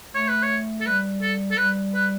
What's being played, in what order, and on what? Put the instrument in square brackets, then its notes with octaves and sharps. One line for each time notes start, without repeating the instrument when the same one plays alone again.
[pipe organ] A3 [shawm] C#5
[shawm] B4
C#5
A4
[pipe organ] G3 [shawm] B4
[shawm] A4
A4
[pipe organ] G3 [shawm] B4
[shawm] B4